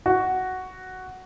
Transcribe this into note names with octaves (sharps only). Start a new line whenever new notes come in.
F#4